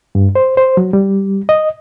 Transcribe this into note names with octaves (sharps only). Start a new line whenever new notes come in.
G2
C5
C5
F#3
G3
D#5